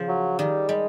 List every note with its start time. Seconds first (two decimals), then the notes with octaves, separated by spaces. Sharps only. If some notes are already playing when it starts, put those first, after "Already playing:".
Already playing: C#3 F3
0.08 F#3
0.38 D#3 G3
0.69 G3 G#3